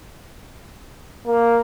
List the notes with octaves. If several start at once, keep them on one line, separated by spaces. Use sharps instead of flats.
A#3